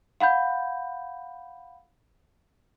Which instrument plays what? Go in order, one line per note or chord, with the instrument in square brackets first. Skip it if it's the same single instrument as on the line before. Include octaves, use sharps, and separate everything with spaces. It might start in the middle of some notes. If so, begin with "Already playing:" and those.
[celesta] F5 F#5 B5 G6